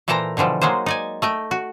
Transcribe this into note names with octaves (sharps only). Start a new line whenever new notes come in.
A#2 E3 A4 C5 G5 A#5
B2 D3 E3 F3 G3
F#3 G#3 A#3 D#4 C5
D#4 D5 G#5
A3 D#5 G5
F#4